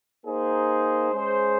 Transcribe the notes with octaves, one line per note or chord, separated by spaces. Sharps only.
A#3 D#4 G#4 C5
G#3 C#4 G#4 C5